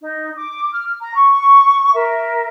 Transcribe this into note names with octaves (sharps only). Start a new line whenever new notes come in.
D#4
D6
F6
A#5
C#6
A#4 E5